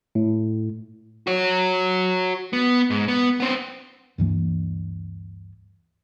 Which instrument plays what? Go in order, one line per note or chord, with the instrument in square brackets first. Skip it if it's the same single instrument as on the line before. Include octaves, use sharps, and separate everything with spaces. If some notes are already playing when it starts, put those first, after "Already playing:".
[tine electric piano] A2
[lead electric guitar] F#4 C#5
B3
G#2
B3
B3 C4
[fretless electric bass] D2 G2 E3 A#3